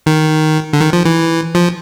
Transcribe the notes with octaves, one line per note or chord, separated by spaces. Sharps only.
D#3
D3
D#3
F3
E3
F3